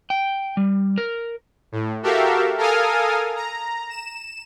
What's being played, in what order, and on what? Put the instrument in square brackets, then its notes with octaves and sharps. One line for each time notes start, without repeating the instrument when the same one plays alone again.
[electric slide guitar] G5
G3
A#4
[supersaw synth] A2
F#4 G4 A4 A#4 E5 F5
A4 A#4 F5 G#5 D#6 F6
A#5
E7